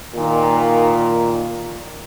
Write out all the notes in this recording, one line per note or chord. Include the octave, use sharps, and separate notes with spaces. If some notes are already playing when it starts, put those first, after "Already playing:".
A#2 D#3